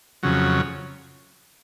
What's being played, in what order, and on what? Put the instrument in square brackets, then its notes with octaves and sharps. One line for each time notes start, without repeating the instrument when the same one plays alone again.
[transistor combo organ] F2 C#3 F#3